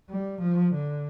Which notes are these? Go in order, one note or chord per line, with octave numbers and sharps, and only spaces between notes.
G3
F3
D3